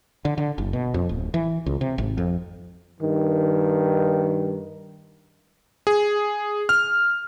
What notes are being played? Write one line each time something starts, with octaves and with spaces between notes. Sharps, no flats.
D3
D3
F#1
B2
F2
D1
E3
C#2
C3
G#1
F2
G2 D#3
G#4
F6